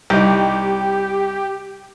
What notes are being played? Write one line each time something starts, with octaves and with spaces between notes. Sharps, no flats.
C2 D#4 G4